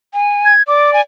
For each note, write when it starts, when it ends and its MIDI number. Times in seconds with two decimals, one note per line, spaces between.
0.14 0.53 80
0.45 0.63 92
0.68 1.00 74
0.68 0.93 86
0.93 1.01 80